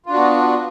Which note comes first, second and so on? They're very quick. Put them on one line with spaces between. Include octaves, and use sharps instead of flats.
F4 D4 F#4 B3